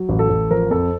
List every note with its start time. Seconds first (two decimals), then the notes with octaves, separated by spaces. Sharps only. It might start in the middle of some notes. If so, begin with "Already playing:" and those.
Already playing: F#3
0.09 A1
0.19 A4
0.29 A1
0.51 F3 A#4
0.71 F2 A4